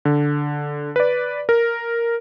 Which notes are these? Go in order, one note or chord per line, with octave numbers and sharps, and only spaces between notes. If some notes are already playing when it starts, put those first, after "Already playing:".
D3
B4 D5
A#4